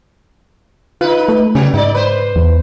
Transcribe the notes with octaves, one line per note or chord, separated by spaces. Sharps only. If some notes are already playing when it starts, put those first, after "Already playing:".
D#4 F4 B4
A3
C#3 F#3
G#2 D#4 D5
B4 C5
E2